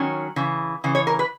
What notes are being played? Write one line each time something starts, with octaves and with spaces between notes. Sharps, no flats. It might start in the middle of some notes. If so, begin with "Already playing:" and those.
Already playing: D#3 F#3 C#4
C#3 E3
C#3 E3
C#5
A#4
B4